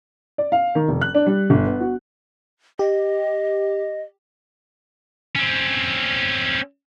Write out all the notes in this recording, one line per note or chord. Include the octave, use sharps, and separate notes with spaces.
D5
F5
D#3
F1
F#6
D4
G3
G1
B3
F#4
G4 D#5
C4 C#4